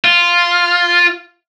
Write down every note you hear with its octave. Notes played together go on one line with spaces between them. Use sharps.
F4